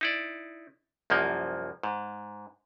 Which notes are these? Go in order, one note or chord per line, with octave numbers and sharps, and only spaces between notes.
D#4 E4 D5
C2 F#2 F3 A#3
G#2